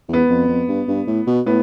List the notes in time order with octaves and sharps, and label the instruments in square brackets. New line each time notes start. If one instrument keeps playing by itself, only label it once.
[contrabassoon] E2
[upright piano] B3
[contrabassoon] F2
F2
G2
G2
A2
B2
[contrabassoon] A2 [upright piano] B3